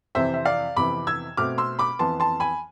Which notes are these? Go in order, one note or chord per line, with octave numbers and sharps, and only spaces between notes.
F2 C3 E3 C5 E5
E5
D5 F5
F2 C3 E3 B3 B5 D6
E6 G#6
B2 A3 C4 D6 F6
C6 E6
B5 D6
F2 E3 B3 A5 C6
A5 C6
G#5 B5